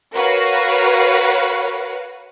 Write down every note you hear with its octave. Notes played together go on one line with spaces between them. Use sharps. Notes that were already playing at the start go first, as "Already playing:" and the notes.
F#4 A#4 B4 C#5 F5 F#5